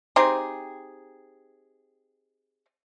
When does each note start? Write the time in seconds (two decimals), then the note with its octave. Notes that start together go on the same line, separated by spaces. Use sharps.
0.16 C4 D#4 G4 G#4